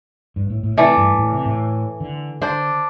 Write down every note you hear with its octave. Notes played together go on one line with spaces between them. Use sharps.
G2
A2
A2
C3 E3 A3 D5
G2
A2
C3
A2
D3
D3 D4 C5